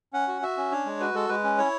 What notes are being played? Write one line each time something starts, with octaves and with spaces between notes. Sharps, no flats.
C#4 F#5
F#4
F#4 E5
C#4
D4 C#5
G#3
F#4 B4
G#3 A4
G#3 B4
C#4
E4 C#5